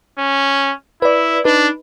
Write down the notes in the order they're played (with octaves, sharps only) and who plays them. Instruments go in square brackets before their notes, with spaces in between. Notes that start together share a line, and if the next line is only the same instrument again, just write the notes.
[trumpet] C#4
[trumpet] E4 [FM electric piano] B4 D5
[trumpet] D4 [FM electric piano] D#4 B4